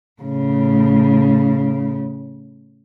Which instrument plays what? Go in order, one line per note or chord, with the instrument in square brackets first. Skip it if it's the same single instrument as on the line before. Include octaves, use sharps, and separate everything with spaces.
[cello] A2 C#3